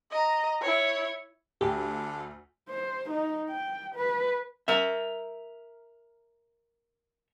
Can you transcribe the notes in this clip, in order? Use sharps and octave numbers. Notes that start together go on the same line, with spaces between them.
D#5 A#5
E4 C#5
D2 D3 G4
C5
D#4
G5
B4
A#4 E5